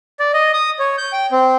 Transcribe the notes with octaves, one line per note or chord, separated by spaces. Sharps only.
D5
D#5
D#6
C#5
G6
G5
C4